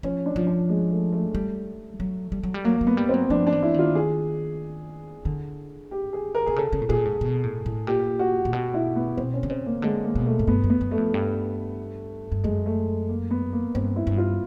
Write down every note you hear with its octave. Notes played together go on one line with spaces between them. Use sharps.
F3 C#4
D4
F3
D4
G#3
A3
A3
G3
F#3
G3
F#3
G3
F#3 A#3
F#3
B3
G3
F#3 C4
F3 D4
D4
E3
E4
D#3 F4
G#4
D3
G4
G#4
A#4
C3 G#4
C#3 A4
C#3
A2
A#2 G#4
G#2
B2
A2
A2
A#2 G4
F#4
A#2
B2 F#4
E4
B3
B2 C4
C#4
D3
C#3 C4
A#3
D3 G#3
A#3
B2
A3
G#2
G2 B3
F#2
B3
F#2
A3
F2
G2
G2
F#2 G#3
A3
A#3
B3
A#3
G2 C4
E4
G2
F4